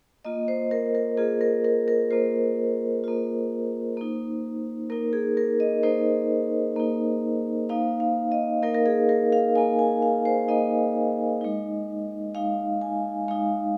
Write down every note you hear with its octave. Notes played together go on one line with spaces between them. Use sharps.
A#3 F4 D#5
C5
A#4
A#4
A#3 F4 G#4
A#4
A#4
A#4
A#3 F4 C5
A#3 F4
A#3 D#4
A#3 D#4 A#4
G#4
A#4
D#5
A#3 D#4 C5
A#3 D#4
A#3 D#4 F5
F5
D#5
A#3 D#4 A#4
A#4
G#4
A#4
F5
A#3 D#4 G#5
G#5
F5
C5
A#3 D#4 D#5
G#3 D#4
G#3 D#4 F5
G#5
G#3 D#4 F5